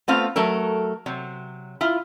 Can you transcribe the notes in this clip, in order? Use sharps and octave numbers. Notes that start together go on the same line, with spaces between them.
A3 B3 C4 F4 F5
F#3 A3 A4 A#4
C3 F#3
E4 F4